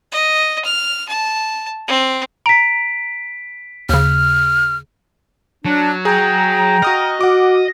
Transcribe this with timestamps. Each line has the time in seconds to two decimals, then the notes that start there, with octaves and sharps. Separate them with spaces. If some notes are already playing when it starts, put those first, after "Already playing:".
0.12 D#5
0.64 F6
1.08 A5
1.87 C4
2.46 A#5 B6 D7
3.89 D#2 C#3 F6
5.65 F#3 D4
6.05 G#4 G5 A#5
6.82 F#4 D#5 D#6 F6
7.21 F#4 F#5 D6